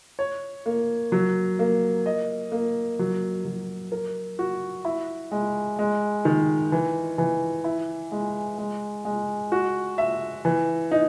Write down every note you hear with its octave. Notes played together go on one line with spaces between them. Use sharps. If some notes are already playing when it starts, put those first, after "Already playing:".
C#5
A#3
F#3
A#3
D#5
A#3
F#3
F#3
A#4
F#4
E4
G#3
G#3
D#3
E3
E3
E4
G#3
G#3
G#3
F#4
E5
E3
D#4